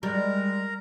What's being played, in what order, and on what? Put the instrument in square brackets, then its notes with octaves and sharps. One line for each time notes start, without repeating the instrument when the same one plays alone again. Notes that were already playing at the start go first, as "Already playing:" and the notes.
[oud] G3 [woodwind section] G#3 [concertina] A#4 A#5